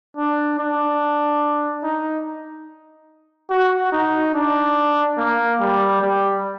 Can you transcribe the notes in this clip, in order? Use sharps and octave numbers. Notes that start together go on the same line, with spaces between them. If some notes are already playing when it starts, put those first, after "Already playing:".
D4
D4
D#4
F#4
D#4
D4
A#3
G3
G3